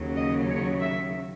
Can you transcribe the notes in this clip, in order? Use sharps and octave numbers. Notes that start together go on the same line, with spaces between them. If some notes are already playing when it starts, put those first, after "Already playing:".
Already playing: D#2 C#3 F#3
D#5
C#5
E5